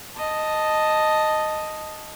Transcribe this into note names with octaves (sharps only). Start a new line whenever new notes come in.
D#5 A5